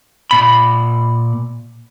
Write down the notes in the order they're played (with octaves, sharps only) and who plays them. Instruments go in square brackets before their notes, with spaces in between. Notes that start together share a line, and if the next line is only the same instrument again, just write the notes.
[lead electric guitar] A#2 B5